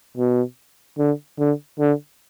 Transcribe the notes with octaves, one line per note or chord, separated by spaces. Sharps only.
B2
D3
D3
D3